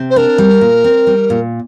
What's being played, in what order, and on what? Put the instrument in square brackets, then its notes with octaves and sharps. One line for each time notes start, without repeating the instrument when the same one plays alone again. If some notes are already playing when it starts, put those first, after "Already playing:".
Already playing: [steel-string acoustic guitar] C3 C4
[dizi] C5
[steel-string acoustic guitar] D4 [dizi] A#4
[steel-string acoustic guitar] G3
A#2
C4
G3
A#2